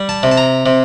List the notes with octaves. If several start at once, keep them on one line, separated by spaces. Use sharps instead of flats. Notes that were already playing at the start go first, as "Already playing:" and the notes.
Already playing: G3
A5
C3
A5
A#5
C3